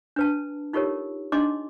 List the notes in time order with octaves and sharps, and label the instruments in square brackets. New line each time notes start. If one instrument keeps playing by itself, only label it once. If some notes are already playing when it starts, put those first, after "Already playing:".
[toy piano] D4 B4 A5
D#4 F4 G4 A4 A#4 C#5
D4 D#4 D#5 C6 D6